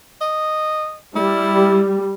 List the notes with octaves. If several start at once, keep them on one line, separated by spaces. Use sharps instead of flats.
D#5
G3 E4